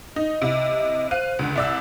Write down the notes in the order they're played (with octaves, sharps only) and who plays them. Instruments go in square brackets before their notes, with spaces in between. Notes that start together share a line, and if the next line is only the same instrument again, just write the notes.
[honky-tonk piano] D#4 [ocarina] D#5
[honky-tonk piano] C3 E4
[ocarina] C5 [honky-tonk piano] F5 F#6 D#7
[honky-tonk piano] C#2 D3
[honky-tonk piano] C2 D5 E6 [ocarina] E5